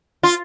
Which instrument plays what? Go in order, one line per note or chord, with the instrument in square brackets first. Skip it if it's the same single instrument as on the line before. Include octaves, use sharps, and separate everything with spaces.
[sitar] F4